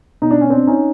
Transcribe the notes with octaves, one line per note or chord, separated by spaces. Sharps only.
B2 D#4
D4
C#4
C4 D4
C#4 D#4